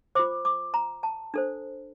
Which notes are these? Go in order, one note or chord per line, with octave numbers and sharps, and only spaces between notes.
F4 C5 D6
D6
A#5
A5
D4 A4 C5